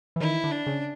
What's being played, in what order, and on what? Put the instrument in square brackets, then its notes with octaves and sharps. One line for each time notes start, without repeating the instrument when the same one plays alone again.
[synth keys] E3
[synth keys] D#3 [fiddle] E4
[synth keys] D3
[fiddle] D4
[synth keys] C#3